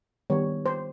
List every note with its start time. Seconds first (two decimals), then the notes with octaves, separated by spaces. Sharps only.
0.30 D#3 G3 B3 C#5
0.66 C5